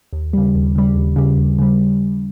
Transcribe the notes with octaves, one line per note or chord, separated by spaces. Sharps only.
D#2
C#3 G3
D#2
C#3 G3
D#2
C#3 G3
D#2
C#3 G3